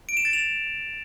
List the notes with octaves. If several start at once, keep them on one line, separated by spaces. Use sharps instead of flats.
D7
E7
A6
F7